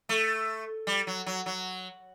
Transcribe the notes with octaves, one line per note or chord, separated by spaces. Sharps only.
A3
G3
F#3
F#3
F#3